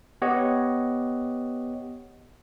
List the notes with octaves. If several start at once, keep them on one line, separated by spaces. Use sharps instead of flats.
B3 G4 C#5 D#5 F#5